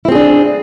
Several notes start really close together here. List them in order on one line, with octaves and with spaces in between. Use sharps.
E4 C4 G#4 D4